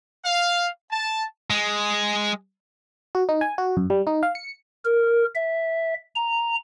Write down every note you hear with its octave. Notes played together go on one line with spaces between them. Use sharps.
F5
A5
G#3
F#4
D#4
G#5
F#4
F#2
G3
D#4
F5
C#7
A#4
E5
A#5